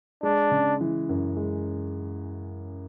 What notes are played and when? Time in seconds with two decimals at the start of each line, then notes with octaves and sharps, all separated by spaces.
0.23 G#3 D4
0.51 C#3
0.81 E3
1.09 F#2
1.37 G#3